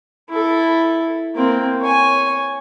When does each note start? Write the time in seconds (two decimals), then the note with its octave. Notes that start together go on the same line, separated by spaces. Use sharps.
0.29 E4 A4
1.35 A#3 C4
1.81 C#5 G#5